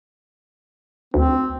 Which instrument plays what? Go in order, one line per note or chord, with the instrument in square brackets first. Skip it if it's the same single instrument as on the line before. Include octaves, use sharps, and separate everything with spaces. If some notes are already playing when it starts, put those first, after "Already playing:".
[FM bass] D2 [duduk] C4